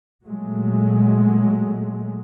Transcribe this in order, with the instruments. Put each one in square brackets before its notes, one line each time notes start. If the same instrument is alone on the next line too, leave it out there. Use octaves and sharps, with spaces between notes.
[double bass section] A#2 F#3 G#3 A3